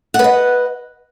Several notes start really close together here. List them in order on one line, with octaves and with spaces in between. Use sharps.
F#5 B4 D#5